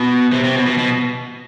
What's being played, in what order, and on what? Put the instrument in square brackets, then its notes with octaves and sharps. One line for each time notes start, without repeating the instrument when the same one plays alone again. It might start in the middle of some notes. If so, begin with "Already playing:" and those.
Already playing: [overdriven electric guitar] B2
C3
C3
B2
B2
B2